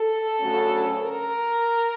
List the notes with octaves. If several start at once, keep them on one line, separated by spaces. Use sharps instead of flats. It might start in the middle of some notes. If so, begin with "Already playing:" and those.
Already playing: A4
D2 C#3 F#3 A3 C#4
A#4